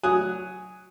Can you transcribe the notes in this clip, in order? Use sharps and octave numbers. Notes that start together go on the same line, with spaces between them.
F#3 G#5 D#6 F#6